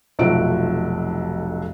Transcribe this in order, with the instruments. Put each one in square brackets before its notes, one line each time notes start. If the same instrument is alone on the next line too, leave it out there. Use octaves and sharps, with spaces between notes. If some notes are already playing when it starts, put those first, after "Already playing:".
[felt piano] F1 B1 F4 F#4 E5 D7